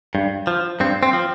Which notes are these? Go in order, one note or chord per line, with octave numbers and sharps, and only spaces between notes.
G2
F3
G2 C4
C4
F3